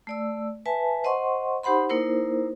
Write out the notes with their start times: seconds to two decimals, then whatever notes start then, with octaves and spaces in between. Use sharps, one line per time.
0.07 A3 D5 E6
0.66 B4 E5 G#5 A5
1.04 C5 D#5 F#5 C6 C#6
1.63 D#4 G4 C5 F#5 B5 C6
1.89 A#3 D#4 E4 A#4 C5